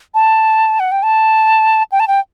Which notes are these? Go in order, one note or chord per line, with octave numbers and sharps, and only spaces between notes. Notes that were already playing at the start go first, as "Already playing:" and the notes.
A5
F#5
G5
A5
G5
A5
G5